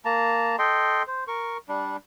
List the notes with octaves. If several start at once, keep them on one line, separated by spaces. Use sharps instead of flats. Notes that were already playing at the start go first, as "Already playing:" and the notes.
A#3 A5 A#5
A4 D#5 G5 C6
C5
A#4 C#6
G3 D4